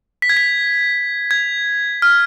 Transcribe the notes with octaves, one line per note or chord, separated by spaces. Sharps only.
B6
G#6
B6
G#6
F6